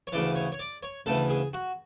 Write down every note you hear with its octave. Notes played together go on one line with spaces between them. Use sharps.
C#5
D2 C#3 E3 D5
C#5
C#5
D5
C#5
D2 C#3 E3 A4
G#4
F#4